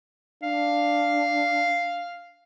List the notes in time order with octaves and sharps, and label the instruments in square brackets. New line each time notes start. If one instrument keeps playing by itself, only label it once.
[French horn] D4 [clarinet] F5